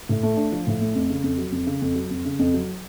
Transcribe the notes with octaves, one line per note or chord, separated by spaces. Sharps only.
A2
A3
D4
F3
A2
A3
F2
C#3
F2
F#3
F2
C#3
F2
F#3
F2
C#3
F2
F#3